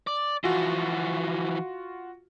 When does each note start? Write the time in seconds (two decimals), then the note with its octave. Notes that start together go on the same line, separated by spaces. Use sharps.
0.07 D5
0.44 E3 F3 F4 F#4